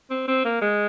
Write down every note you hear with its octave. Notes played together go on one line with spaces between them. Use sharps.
C4
C4
A#3
G#3